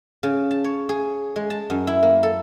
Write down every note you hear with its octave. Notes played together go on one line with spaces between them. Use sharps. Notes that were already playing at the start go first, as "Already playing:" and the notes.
C#3
A5
C#5
G#4
G#3
A5
F#2
E4
A#3
A4